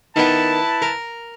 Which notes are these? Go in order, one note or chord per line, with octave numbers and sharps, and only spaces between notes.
D#3 B3 E4 B4 A5
A#4